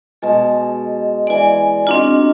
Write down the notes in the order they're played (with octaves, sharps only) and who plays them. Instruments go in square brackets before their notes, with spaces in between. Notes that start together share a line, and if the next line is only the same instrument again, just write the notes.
[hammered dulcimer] B2 G#3 A5
[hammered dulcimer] E3 G#3 [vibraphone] D5 G#5
[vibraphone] C4 D4 F4 [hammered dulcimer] D#4 F#4